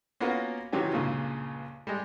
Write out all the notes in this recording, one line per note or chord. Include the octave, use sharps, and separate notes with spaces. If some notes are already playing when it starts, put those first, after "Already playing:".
A#3 B3 C#4 F4 F#4 A#4
C3 D#3 E3 F#3 C#4 G4
C#2 G2 A#2 C#3
G3 G#3